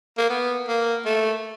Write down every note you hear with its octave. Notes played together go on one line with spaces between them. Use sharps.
A#3
B3
A#3
A3